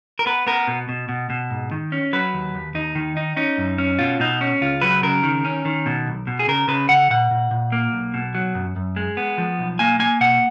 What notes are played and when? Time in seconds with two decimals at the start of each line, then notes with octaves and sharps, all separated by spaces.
0.19 A#4
0.26 B3 B4
0.47 B3 A#4
0.68 B2
0.89 B2
1.09 B2
1.30 B2
1.50 G#2
1.71 D#3
1.92 C#4
2.13 F#3 B4
2.34 D#2
2.55 D#2
2.75 D#2 D#4
2.95 D#3
3.17 D#4
3.37 C#4 D#4
3.58 F#2
3.78 C#4
3.99 B2 F4
4.20 B2 D#4
4.41 C#4
4.61 C#2 F4
4.81 F#3 B4
5.03 C#3 A#4
5.23 D#3
5.45 C#4
5.65 D#3
5.86 B2
6.07 B1
6.27 B2
6.39 G#4
6.48 C#3 A#4
6.68 C#3 B4
6.89 C#3 F#5
7.10 A#2 F#5
7.31 A#2
7.51 A#2
7.72 A#3
7.93 B1
8.14 B2
8.35 F#3
8.55 F#2
8.76 F#2
8.96 G#3
9.17 B3
9.38 F3
9.59 B1
9.79 A#3 G#5
9.99 A#3 G#5
10.21 B2 F#5